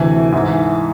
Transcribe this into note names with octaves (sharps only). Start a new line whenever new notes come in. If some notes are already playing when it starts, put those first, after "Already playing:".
Already playing: D2 C3 E3 G#5
G#2 E3